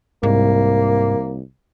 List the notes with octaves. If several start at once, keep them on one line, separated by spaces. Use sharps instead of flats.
C2 G#2 A#3